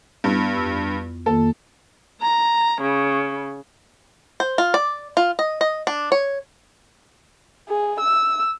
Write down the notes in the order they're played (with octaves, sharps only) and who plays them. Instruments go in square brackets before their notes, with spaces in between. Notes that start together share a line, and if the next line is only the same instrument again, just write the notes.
[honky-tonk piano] G2 [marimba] B3 E4
[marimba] F2 E6
[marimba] F2 D#3 A#3 [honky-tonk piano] A4
[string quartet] A#5
C#3
[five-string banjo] C5
F4
D5
F4
D#5
D#5
D4
C#5
[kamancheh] G#4
E6